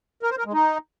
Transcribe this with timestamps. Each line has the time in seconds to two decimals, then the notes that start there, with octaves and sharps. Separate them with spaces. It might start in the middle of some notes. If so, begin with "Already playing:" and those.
0.23 A#4
0.30 C5
0.38 A#4
0.45 G#3
0.53 D#4